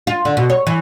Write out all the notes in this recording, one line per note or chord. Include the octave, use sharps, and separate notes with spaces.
F4
D3
B2
C#5
E3